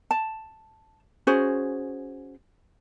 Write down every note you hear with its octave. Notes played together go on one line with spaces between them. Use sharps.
A5
C#4 F#4 G#4 C5